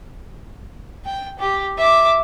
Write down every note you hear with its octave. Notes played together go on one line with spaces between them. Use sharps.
G5
G4
E5 D6